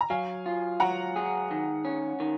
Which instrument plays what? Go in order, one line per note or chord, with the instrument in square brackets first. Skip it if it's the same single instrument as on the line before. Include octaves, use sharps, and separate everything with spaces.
[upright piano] A#5
[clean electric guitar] F#3 [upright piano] F5 G#5
[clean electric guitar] F4
[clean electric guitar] F#3 [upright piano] F#5 A#5
[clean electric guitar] G#4
D#3
C#4
D#3